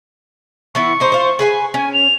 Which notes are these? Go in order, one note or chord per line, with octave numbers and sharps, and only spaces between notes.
E3 B3 E4 C#6
G#3 D#4 C5
F4 C5
G#4 B4 G#5
C#4 G#5
F7